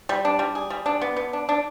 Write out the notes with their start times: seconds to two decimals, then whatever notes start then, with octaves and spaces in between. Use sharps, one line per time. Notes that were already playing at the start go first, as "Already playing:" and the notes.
0.09 G3
0.25 D4
0.39 G3
0.55 G#4
0.70 G3
0.86 D4
1.01 B3
1.16 B3
1.33 D4
1.49 D4